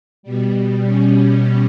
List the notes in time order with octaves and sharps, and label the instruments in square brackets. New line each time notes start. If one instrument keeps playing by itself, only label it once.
[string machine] B2 G3
C#4